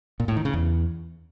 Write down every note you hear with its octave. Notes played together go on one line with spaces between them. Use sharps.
A#2
A2
D#3
C#3
E2